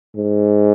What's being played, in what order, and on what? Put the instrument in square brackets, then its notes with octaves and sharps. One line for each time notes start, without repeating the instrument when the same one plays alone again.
[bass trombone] G#2